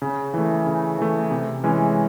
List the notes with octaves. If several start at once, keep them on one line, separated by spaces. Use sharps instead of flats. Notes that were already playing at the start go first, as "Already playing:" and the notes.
C#3
E3 A3
C#3
E3 A3
C3
E3 G#3 C#4